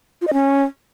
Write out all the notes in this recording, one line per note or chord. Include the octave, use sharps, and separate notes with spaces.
F4
D#5
C#4